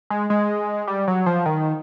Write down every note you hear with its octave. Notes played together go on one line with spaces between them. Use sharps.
G#3
G#3
G3
F#3
F3
D#3